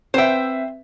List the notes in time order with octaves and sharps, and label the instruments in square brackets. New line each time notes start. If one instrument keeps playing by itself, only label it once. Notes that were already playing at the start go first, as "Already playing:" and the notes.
[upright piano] C4 B4 E5 [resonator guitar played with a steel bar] C5 G5